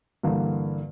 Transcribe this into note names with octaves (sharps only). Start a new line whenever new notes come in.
G2 D3 E3 A#3